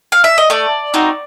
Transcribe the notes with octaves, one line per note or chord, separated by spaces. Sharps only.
F5
E5
D#5
A3 D5
C4 D#4 F#4